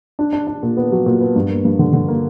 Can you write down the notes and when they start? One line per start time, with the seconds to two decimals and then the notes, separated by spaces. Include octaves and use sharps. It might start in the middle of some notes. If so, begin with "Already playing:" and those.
0.19 D4
0.33 D4
0.47 D4
0.63 A#2
0.77 B3
0.92 F#3
1.06 A#2
1.21 B3
1.36 G2
1.50 A#3
1.65 G2
1.79 D3
1.93 D3
2.08 A#3